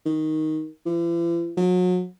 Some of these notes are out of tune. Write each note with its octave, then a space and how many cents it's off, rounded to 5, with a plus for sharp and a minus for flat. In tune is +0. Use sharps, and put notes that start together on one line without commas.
D#3 +5
E3 +45
F#3 -35